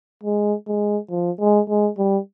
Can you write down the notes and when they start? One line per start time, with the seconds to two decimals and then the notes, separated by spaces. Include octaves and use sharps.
0.23 G#3
0.67 G#3
1.11 F3
1.40 G#3
1.69 G#3
1.98 G3